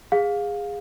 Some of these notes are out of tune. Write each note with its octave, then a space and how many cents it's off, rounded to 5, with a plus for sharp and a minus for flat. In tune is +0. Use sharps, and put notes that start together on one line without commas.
G#4 -20 F5 +20